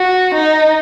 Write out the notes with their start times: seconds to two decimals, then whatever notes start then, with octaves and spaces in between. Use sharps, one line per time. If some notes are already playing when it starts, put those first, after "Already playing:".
Already playing: F#4
0.34 D#4